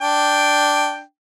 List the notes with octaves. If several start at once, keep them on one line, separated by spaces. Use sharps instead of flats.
D4 G5